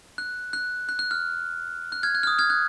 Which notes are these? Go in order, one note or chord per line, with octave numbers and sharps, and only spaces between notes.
F#6
F#6
F#6
F#6
F6
F#6
F6 G#6
F#6
F6
D#6
F6 G#6
F#6